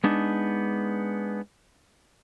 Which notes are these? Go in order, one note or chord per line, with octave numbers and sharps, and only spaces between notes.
G#3 B3 D4 D#4